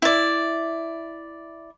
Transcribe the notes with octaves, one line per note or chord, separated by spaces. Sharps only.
E4 D5